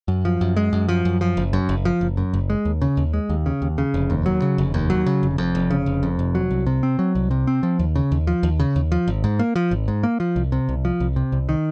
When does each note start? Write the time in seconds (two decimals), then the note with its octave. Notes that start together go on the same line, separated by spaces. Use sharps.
0.08 F#2
0.25 F3
0.41 F#2
0.56 G#3
0.73 F#2
0.89 F3
1.05 F#2
1.21 F3
1.37 F#1
1.53 F#2
1.69 F#1
1.85 F3
2.01 F#1
2.17 F#2
2.33 F#1
2.50 G#3
2.65 D#2
2.82 C#3
2.97 D#2
3.13 G#3
3.30 D#2
3.46 C#3
3.62 D#2
3.78 C#3
3.94 F1
4.10 D#2
4.26 F#3
4.42 C#3
4.58 F1
4.74 D#2
4.90 F#3
5.06 C#3
5.23 F1
5.38 F2
5.55 F1
5.71 C#3
5.86 F1
6.03 F2
6.19 F1
6.35 F#3
6.51 C2
6.66 C3
6.83 C4
6.99 F#3
7.15 C2
7.31 C3
7.47 C4
7.63 F3
7.79 D#2
7.96 C#3
8.12 D#2
8.27 F3
8.43 D#2
8.60 C#3
8.76 D#2
8.92 F3
9.08 G#1
9.24 G#2
9.39 A#3
9.56 F3
9.71 G#1
9.88 G#2
10.03 A#3
10.20 F3
10.36 C2
10.52 C3
10.69 C2
10.85 F3
11.00 C2
11.16 C3
11.32 C2
11.49 D#3